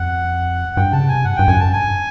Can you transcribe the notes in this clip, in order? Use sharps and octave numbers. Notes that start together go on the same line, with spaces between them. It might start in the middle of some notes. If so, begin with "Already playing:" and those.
Already playing: F2 F#5
G2 G5
C#3 A5
C3 G#5
G2 F#5
G2 G5
F#2 G#5
A5
G2 G#5